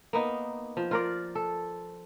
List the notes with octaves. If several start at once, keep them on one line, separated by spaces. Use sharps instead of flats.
A#3 B3 D#4
F3
F4 A#4 D5
A4